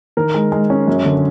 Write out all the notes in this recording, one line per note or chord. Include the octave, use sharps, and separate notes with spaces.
D#3 A#4
G#3
G#3
C#4
F#2
D3